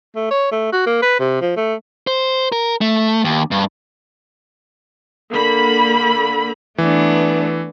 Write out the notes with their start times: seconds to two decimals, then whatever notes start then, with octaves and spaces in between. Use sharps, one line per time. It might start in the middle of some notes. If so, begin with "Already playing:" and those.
0.16 A3
0.31 C#5
0.52 A3
0.72 F#4
0.86 A#3
1.02 B4
1.20 C3
1.41 F3
1.56 A3
2.07 C5
2.52 A#4
2.81 A3
3.24 D#2
3.51 G2
5.32 D3 A#3 B5
6.78 E3 A3 B3 D4